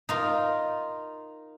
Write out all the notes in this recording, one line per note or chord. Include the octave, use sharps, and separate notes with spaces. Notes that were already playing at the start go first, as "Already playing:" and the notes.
D#4 F4 A#4